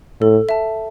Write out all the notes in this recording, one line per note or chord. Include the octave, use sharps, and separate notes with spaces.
A2 A4
E5 A5